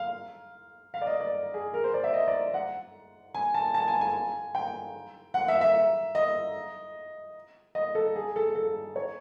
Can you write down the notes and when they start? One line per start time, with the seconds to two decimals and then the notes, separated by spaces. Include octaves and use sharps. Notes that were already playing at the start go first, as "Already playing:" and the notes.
Already playing: F5
0.94 F5
1.02 D5
1.07 D#5
1.20 D5
1.54 G#4
1.74 A#4
1.84 C5
1.94 D5
2.04 E5
2.14 D#5
2.27 D5
2.54 F#5
3.34 G#5
3.54 A5
3.74 A5
3.88 G#5
4.01 G#5
4.55 G5
5.34 F#5
5.48 E5
5.61 E5
6.15 D#5
7.75 D#5
7.95 A4
8.16 G#4
8.36 A4
8.55 A4
8.96 C#5